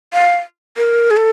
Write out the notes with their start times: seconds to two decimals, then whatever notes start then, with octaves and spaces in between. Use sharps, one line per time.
0.13 F5
0.77 A#4
1.11 G#4
1.17 A4